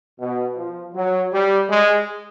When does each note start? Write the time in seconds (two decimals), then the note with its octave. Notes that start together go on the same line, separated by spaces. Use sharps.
0.20 B2
0.57 F3
0.95 F#3
1.33 G3
1.69 G#3